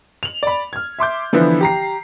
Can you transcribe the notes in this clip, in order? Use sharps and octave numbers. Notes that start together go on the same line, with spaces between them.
F7 F#7
D5 B5
F6 G#6
E5 C6 D6 G6
D3 E3 F3 B3 E4
G4 A#5 C7